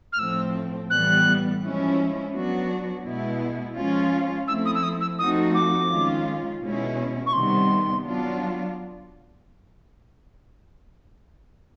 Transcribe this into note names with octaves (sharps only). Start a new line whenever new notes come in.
F6
A2 F3 A3 C4 E6
A2 E3 G3 B3 F#6
F3 G#3 C#4 E4
F#3 B3 D4 F#4
B2 G#3 B3 E4
F3 G#3 C#4 F4
F3 A3 C4 E4 E6
D#6
E6
D#6
E6
F3 A3 C4 D#4 F#4 D#6
D6
D#3 G#3 C#4 F4
B2 G#3 C#4 E4
C#6
C3 D#3 G3 B3 C6
F#3 B3 D4 F4